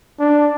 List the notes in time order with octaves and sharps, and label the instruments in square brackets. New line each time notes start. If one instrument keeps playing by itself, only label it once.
[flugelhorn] D4